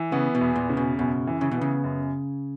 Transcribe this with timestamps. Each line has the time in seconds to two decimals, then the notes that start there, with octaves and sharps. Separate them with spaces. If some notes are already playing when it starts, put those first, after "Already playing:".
Already playing: E3
0.12 C#3 B3
0.35 B2
0.41 E2
0.56 A#2
0.69 C#3
0.77 B2
0.99 F#2 B2
1.27 E3
1.41 C#3
1.51 B2 B3
1.61 C#3
1.84 F#2